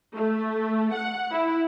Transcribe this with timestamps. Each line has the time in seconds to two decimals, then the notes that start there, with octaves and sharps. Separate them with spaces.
0.15 A3
0.94 F#5
1.31 E4